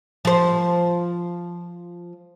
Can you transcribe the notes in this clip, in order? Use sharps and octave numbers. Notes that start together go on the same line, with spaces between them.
F3 C5